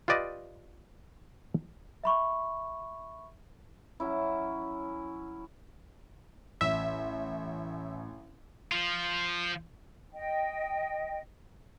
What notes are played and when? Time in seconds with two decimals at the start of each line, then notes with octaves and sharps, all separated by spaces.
0.08 F4 G4 B4 D5 D#5
2.04 E5 B5 C#6
4.00 F#3 C#4 E4
6.61 A1 E5
8.72 F3 F4
10.14 D#5 G5